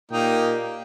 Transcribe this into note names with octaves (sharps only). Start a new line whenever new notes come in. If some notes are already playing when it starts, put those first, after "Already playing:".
A#2 A#3 D#4 G4 G5